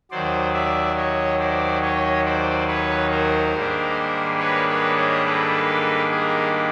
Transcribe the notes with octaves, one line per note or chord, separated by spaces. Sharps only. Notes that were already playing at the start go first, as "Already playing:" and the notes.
D#2 D#3 F#3 C5 D5
D5 E5
C#5 D#5
C5 D5
C#5 D#5
C5 D5
B4 C#5
A#4 C5
G#2 D#3 G3 A#3 D4
B4 C#5
B4 C#5
C#5 D#5
A4 B4
G#4 A#4